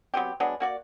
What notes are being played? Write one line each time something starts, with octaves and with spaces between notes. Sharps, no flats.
F#3 B3 C4 G4
F#3 G#3 B3 D4
A#3 F#4 D5